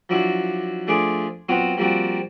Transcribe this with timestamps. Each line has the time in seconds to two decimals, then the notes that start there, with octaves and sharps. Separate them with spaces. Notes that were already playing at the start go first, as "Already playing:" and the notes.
0.09 F3 F#3 D4 E4 F#4
0.87 F3 A3 D4 G#4 C6 D6
1.49 F#3 B3 C4 F4 F#4
1.77 F3 G3 A#3 C4 F#4